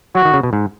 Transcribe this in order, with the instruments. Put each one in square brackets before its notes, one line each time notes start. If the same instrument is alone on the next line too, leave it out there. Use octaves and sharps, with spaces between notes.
[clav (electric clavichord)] F#3 [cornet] F#4
[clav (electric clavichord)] D#3
C#3
B2
G#2